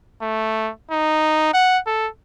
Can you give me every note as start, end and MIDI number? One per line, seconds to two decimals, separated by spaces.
0.22 0.72 57
0.91 1.51 63
1.54 1.79 78
1.87 2.09 69